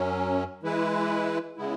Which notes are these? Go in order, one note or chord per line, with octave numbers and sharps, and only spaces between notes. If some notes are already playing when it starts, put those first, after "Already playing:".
Already playing: F#2 F#3 C#4
E3 G#3 E4 B4
C#3 G#3 B3 E4